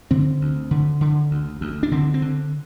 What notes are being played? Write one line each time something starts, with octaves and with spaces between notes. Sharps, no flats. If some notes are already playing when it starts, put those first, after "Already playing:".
D3 C4
D2
D3
D3
D2
D2
D4
D3 C4
C4
D3